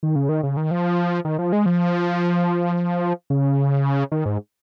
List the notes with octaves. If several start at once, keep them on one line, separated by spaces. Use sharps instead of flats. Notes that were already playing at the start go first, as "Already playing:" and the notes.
D#3
C#3
D#3
C#3
D#3
F3
D#3
F3
G#3
F3
C#3
D#3
G#2